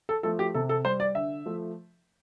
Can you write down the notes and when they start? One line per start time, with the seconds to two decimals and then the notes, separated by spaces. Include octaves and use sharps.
0.09 A4
0.23 F3 A3 A4
0.39 G4
0.54 C3 A4
0.69 A4
0.85 G3 C5
1.00 D5
1.15 D3 E5
1.46 F3 A3